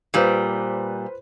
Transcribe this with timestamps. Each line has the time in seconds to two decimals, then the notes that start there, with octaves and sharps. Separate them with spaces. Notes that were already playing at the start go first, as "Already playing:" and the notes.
0.14 A#2 G3 F4 B4 C5